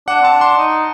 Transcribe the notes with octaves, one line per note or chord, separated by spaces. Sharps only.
D4 F#5
C4 A5
D4
C6
D#4